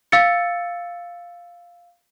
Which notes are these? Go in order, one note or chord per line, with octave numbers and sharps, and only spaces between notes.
F5 E6 A6 C#7